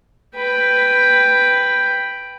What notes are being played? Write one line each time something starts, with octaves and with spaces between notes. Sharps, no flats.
B4 G5